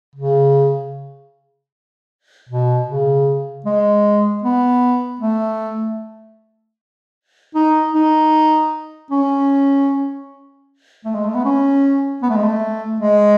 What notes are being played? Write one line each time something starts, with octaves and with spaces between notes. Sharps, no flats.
C#3
B2
C#3
G#3
B3
A3
D#4
D#4
C#4
A3
G#3
A3
B3
C#4
B3
A3
G#3
A3
G#3